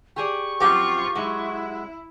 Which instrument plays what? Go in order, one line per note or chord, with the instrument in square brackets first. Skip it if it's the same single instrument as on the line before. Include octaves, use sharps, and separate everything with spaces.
[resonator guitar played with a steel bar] G4 G#4 D5 [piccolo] C#6
[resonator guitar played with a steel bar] F#2 F3 C4 [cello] F4 [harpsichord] G4
[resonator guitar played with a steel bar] F#3 G#3 [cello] E4